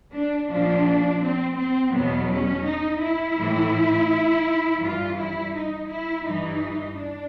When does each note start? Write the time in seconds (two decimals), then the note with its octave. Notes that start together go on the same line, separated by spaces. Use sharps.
0.15 D4
0.51 A#2 F3 D4
1.23 C4
1.59 C4
1.94 E2 B2 F#3 B3
2.31 C#4
2.66 D#4
3.03 E4
3.38 A2 E3
4.82 G2 E3 F4
5.18 E4
5.54 D#4
5.90 E4
6.25 G2 E3 D#4
6.97 D4